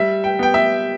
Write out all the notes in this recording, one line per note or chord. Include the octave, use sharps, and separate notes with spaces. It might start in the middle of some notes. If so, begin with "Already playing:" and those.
Already playing: G3 E5
G5
B3 G5
E5